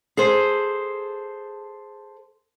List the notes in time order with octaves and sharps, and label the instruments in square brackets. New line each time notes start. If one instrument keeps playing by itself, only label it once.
[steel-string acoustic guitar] G#4 A4 C5